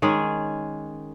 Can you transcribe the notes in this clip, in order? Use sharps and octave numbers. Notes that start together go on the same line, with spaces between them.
D#3 G#3 C#4 G#4